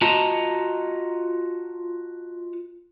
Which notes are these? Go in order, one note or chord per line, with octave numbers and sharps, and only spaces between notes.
F4 F#4 D#5 A5 A#5